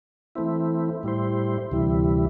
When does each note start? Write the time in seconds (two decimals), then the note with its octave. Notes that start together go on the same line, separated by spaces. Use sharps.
0.35 E3 A3 C4 E4
1.03 A2 G3 E4 C5
1.71 D2 C3 E3 G3 E4